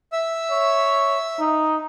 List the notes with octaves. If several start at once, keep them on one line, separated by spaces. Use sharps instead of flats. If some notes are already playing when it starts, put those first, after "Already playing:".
E5 E6
C#5
D#4